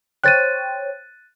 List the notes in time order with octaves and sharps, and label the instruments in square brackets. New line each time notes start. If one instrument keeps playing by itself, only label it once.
[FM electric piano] C5 C#5 G5 [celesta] F#6 A6 D#7